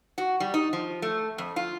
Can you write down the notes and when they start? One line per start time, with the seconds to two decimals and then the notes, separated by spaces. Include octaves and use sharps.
0.18 F#4
0.40 G3
0.54 D#4
0.73 F3
1.02 A3
1.38 F2
1.56 F4